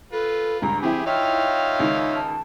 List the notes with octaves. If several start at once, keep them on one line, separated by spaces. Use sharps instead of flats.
F4 A4 B4
C#2 G2 A#5
E3 C4 E4 G4 G#4 B5
D#4 F4 C#5 E5 F5 G5 F6
C#2 D#3
A5